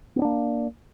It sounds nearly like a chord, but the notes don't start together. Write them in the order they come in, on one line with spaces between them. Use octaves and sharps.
B3 C#4 D4 A#3